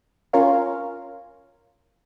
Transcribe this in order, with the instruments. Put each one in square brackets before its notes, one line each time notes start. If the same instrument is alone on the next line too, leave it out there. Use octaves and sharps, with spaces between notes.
[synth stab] C#4 F4 A#4 C#5 F5